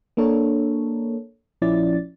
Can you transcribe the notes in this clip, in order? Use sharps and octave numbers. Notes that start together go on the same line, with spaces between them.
A#3 D4 A4 A#4 C#5
A#1 F3 C#4 E4 D5 A6